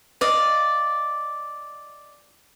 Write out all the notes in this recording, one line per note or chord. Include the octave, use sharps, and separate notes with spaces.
D5 D#5 F5